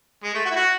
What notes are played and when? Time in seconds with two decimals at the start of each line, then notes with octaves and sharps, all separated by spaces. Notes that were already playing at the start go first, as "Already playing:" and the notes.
0.24 G#3
0.35 A3
0.45 F#4
0.50 E4
0.56 F#4